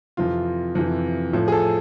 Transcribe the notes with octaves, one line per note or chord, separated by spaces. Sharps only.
F2 C3 E3 F4
F2 C3 E3
A2 F3
G#4
A4